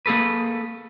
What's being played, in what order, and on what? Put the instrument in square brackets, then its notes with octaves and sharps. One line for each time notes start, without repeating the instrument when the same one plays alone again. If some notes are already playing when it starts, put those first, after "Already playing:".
[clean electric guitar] A#3 G#4 A4 B4